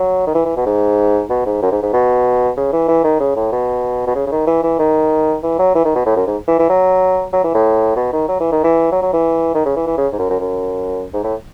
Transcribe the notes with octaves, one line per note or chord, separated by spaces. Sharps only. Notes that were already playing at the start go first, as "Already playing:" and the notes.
Already playing: F#3
D#3
E3
E3
B2
G#2
B2
G#2
F#2
G#2
G#2
B2
C#3
E3
E3
D#3
C#3
A2
B2
B2
C#3
C#3
D#3
E3
E3
D#3
E3
F#3
E3
D#3
B2
A2
F#2
G#2
E3
E3
F#3
F#3
E3
A2
B2
D#3
F#3
E3
D#3
E3
F#3
F#3
E3
D#3
C#3
E3
E3
C#3
G#2
F#2
F#2
F#2
G#2
A2